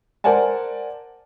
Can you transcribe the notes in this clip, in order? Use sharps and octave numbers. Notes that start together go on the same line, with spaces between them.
A#4 C5 D5 F#5 G#5 A5